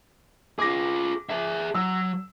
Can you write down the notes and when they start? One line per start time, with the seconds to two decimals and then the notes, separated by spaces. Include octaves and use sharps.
0.59 F4 G#4 D6 A#6
1.30 G#4 E5
1.75 F#3 E6